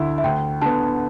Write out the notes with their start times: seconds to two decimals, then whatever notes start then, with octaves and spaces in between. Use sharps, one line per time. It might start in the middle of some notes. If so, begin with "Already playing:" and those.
Already playing: D2 D3 E4
0.18 E5
0.24 D2 G5
0.62 D3 B3 A5